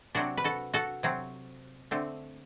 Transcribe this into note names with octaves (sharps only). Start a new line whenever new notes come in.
C3 F#3 C4 D4 F#4
B4
F#4 A4
F#4 A4
C3 F#3 C4
D3 A3 C4